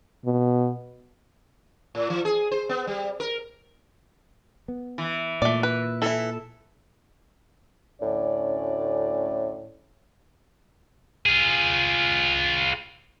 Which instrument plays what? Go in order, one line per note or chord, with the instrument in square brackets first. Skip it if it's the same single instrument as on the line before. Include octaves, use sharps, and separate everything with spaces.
[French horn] B2
[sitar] A2
E3
G#4
C5
B3
G3
A#4
[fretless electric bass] B3
[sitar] E3
[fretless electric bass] A#2 [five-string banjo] A3 D5
[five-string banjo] B4
[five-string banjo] E3 E4 [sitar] A4
[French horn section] D2 C#4 D5 [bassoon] A2
[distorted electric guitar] F4 G#4